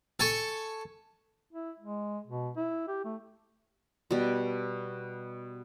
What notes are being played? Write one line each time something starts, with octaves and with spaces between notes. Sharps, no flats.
A4 G#5 C#6
E4
G#3
B2
E4
G4
A3
B2 G3